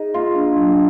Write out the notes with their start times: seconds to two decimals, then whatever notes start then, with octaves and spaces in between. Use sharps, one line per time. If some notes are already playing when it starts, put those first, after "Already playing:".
Already playing: D#4 G#4
0.14 A#3 F4
0.36 D4
0.56 F#3